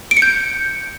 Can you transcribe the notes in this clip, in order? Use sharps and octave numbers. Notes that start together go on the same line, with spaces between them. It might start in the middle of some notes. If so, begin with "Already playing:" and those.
D7
C#7
G6